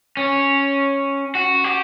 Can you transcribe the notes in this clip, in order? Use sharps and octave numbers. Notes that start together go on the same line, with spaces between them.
C#4
F#4
G4